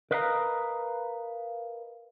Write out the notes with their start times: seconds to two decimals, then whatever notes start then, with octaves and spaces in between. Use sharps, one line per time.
0.11 A#4 B4 D#5 F5 F#5 A#5